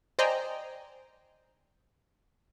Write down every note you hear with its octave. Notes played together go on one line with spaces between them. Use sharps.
C5 D5 D#5 G5 G#5 A#5